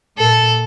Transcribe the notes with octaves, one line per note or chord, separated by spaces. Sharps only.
A#2 A4